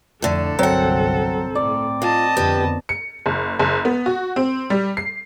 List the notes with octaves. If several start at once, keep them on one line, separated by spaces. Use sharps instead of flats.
F2 A2 D3 A4
G1 C2 F#3 C4 A#4 F#5
A2 D5
F4 D#5 A5
F2 D3 B3 G4 B4
C#7
F#1
F#1
B3
F#4
C4
G3
C7